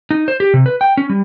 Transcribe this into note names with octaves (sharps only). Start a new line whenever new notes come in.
D#4
C5
G4
C3
B4
G5
C#4
G3